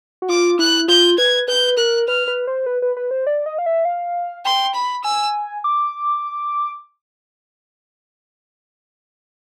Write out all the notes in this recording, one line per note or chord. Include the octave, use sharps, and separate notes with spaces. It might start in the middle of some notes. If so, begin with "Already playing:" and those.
F#4
F4 D6
E4 F#6
F4 G6
B4 G#6
B4 G6
A#4 F#6
B4 F6
B4
C5
B4
B4
B4
C5
D5
D#5
F5
E5
F5
G5 C6
B5
G#5 E6
D6